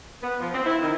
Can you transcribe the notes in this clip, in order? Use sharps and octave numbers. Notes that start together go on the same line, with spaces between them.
B3
F3
C4
E4
D#3